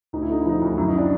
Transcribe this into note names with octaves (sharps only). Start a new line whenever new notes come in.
D2 D#4
E4
D3 D#4
E4
F3 D#4
D2
F#2 E4
D#4
D#3 D4